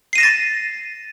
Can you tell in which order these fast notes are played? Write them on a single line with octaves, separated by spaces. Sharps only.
C7 D#7 A#6 E7 A6